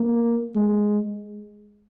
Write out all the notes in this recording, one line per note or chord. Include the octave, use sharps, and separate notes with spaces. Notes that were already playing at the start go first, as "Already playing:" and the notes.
Already playing: A#3
G#3